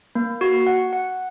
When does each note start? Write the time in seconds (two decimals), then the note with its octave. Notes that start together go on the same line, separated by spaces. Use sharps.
0.15 A#3
0.41 F#4
0.67 F#5
0.93 F#5